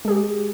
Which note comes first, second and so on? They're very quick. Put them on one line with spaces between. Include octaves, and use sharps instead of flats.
G#3 G#4 G4